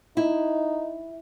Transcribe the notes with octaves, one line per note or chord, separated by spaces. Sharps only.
D#4 E4